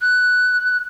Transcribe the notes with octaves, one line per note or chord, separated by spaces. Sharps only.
F#6